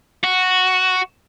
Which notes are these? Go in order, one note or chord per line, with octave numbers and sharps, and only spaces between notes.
F#4